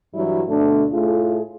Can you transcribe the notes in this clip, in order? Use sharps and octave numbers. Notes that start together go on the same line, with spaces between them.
G2 E3 F#3 G3 E4
D2 B2 A3 D4
A2 A3 F4 G#4